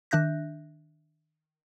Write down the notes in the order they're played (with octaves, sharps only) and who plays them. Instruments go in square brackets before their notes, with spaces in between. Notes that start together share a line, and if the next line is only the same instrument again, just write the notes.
[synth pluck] D#3 D4 E5 F#6 G6 A#6